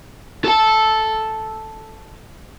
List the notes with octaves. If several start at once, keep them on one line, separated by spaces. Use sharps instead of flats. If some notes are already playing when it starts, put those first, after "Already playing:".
A4 A5